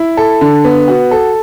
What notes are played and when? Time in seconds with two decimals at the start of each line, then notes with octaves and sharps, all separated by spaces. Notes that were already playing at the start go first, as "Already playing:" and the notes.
Already playing: E4
0.17 A4
0.41 D3
0.65 B3
0.88 F#4
1.11 A4